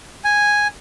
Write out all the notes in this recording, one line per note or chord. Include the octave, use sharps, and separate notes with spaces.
G#5